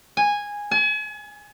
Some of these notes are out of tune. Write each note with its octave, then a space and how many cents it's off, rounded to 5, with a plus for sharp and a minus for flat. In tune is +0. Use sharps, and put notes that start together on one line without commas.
G#5 -10
G#5 +40